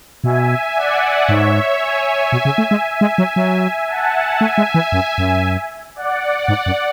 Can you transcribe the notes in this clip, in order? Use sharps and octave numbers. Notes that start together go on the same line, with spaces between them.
B2 E5 G#5
D5 F#5
G#2 C#5 E5
E5 G#5
B2
C#3
A3
G#3
E5 G#5
G#3
F#3
F#3
F#5 A5
A3 E5 G#5
G#3
E3
F#2
F#2
D5 F#5
G#2
F#2